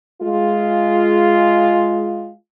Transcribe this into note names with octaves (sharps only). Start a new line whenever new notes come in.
G#3 F4